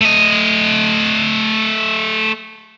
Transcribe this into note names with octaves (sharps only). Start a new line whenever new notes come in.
A3 D#5